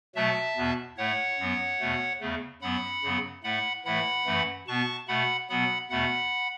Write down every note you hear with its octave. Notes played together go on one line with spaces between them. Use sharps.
B2 F#3 A3 E5 A5
E2 B2 B3
A2 A3 C#5 F#5
F#2 F#3 B3
E2 B2 A3
E2 C#3 A3
F#2 F#3 B3 F#5 B5
F#2 C#3 F#3 B3
A2 A3 F#5 B5
A2 E3 A3 F#5 B5
F#2 E3 A3
B2 B3 A5 C#6
B2 A3 F#5 B5
B2 F#3 B3 F#5 B5
E2 B2 A3 F#5 B5